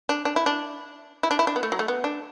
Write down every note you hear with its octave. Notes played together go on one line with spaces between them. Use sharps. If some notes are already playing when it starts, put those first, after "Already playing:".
D4
D4
E4
D4
E4
D4
E4
D4
B3
A3
F#3
A3
B3
D4